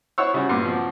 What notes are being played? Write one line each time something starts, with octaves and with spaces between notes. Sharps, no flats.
E4 C5 C#5 F#5 C#6 E6
C#3 G3 C#4 F#4
G2 A#2
F3 C4 F#4